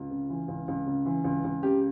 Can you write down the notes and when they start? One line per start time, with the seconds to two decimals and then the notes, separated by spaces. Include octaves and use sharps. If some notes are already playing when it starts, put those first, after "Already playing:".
Already playing: C#2 F4
0.11 C#3
0.30 E3
0.48 C#2
0.68 C#2
0.86 C#3
1.06 E3
1.24 C#2
1.44 C#2
1.63 C#3 G4